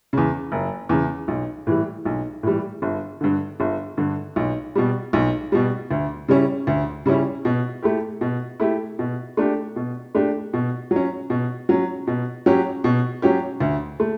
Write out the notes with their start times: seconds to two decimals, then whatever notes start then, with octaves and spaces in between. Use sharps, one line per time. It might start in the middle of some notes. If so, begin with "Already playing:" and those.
0.13 E2 C#3
0.52 F#1
0.89 E2 C#3
1.28 B1
1.67 A2 E3 G3
2.05 B1
2.43 A2 E3 G3
2.82 G1
3.21 G2 D3
3.60 G1
3.97 G2 D3
4.36 B1
4.75 B2 G3
5.13 B1
5.52 B2 G3
5.91 D2
6.28 C#3 G3 C#4 E4
6.67 D2
7.06 C#3 G3 C#4 E4
7.45 B2
7.83 A3 E4 G4
8.21 B2
8.60 A3 E4 G4
8.99 B2
9.37 A3 D4 G4
9.76 B2
10.15 A3 D4 G4
10.53 B2
10.91 F#3
10.96 C#4
11.30 B2
11.69 F#3 C#4
12.07 B2
12.46 F#3 C#4 G4
12.84 B2
13.22 F#3 C#4 G4
13.60 D2
14.00 A3